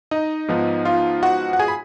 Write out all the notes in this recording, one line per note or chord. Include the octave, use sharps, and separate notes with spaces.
D#4 D#5
G#2 F3 B3 D#4
F4 F5
F#4 F#5
F#5
G#4 G#5
B5